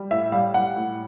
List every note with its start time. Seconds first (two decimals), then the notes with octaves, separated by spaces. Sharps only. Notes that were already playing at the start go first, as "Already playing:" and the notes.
Already playing: G3
0.11 A2 E5
0.32 G3 F5
0.54 G3 F#5
0.76 A2